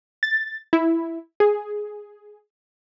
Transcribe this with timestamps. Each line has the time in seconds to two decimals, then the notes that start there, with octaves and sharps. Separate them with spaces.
0.23 A6
0.73 E4
1.40 G#4